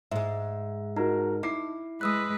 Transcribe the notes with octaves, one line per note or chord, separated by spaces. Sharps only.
G#2 G#3 E5
D#4 F#4 A#4 A#5
E4 D6 C7
G#3 B4 D#6 E6 F#6